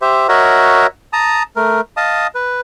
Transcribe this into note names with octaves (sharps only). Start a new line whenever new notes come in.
G4 C5 E5
F#4 A#4 C#5 D#5 E5 F#5
A5 A#5 D#6
A3 A#4
D#5 F5 A5 D#6
B4